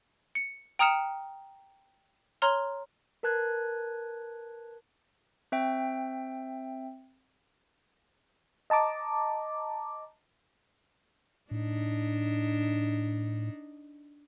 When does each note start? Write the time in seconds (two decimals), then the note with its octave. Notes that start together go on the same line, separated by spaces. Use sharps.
0.35 C#7
0.79 G5 A#5 D#6 F6 C#7 E7
2.42 C#5 A#5 C6 F6 G7
3.23 A#4 B4 A5 F#6 G#6
5.52 C4 E5 G5
8.70 D#5 A5 A#5 D6
11.51 A2 D4 D#4